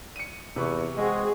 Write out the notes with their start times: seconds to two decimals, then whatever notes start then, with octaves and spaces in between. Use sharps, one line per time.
0.16 C#7 D#7
0.56 E2 C3 B4 C#6
0.97 G#3 C4 F#4 G#4 D#5